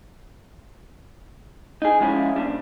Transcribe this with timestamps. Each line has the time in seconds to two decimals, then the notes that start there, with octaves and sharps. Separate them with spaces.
1.82 D#4 G#4
2.00 F3 G#3 C#4 E4 F4
2.36 A#2 G3 D4